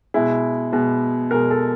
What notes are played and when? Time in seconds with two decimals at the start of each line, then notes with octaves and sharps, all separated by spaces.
0.14 B2 G#3 E4
0.72 B2 G#3
1.31 B2 G#3 A#4
1.51 A4